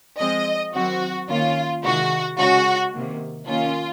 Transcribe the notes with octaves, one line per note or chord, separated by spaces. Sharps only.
F3 G#3 C4 D#5
D#3 F#3 C4 F#4
D#3 A#3 C#4 F4
C3 D#3 G#3 F#4
C#3 G#3 C#4 F#4
C3 D#3 A#3
D#3 A#3 C#4 F4